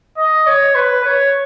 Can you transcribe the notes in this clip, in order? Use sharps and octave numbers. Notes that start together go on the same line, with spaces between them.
D#5
C#5
B4
C#5